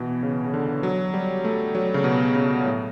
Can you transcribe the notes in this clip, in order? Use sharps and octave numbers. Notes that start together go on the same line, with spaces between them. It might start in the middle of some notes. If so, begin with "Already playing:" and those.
Already playing: B2 E3
C#3
C#3
D3
F#3
G3
A3
F#3
C#3
B2
C#3
A2